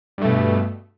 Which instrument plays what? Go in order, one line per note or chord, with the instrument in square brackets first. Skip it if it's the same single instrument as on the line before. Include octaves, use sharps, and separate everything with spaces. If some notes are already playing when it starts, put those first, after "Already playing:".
[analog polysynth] G2
A3
B2